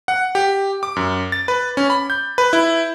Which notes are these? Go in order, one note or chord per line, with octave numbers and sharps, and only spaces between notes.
F#5
G4
D6
F#2
A6
B4
C#4
B5
G6
B4
E4